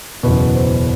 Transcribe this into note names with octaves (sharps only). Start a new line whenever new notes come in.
F#1 E2 B2 B4
C5